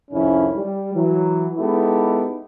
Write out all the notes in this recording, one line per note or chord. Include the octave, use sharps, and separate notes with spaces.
C2 F2 D#3 C#4 E4
G3
E3 F#3
G#3 B3 D#4 E4 G4 A4